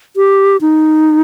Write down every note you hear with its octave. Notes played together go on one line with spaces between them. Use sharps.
G4
D#4